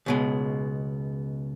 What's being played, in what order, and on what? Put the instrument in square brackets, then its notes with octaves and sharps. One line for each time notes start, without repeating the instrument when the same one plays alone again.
[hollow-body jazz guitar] C#2 B2 G#3